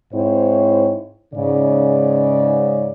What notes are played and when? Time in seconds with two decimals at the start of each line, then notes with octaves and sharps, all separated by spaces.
0.13 G#2 C4 E4 C5 C#5
1.34 G#2 C#3 D5